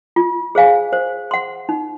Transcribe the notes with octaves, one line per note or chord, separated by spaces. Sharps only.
F4
G#4 C5 F5 G#5
C5
F#5 C6
D#4